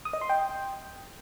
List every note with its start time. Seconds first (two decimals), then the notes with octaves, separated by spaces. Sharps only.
0.05 D#6
0.13 D#5
0.21 C6
0.30 G5